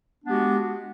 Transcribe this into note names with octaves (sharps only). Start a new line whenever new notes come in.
G#3 B3 D4 F#4 G4